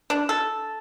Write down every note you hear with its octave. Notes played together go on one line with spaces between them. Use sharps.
D4
A4